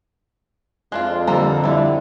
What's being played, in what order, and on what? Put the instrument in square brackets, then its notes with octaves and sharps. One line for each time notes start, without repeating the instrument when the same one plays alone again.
[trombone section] F2 [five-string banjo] G#3 D4 F4 [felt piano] F#6
[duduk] D3 [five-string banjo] F3 A#3 A#5 [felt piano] G3 D4 A4
[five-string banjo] E3 D5 [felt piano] G3 E4 E5